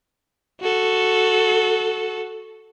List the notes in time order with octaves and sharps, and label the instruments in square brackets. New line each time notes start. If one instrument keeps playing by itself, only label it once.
[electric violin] F#4 A4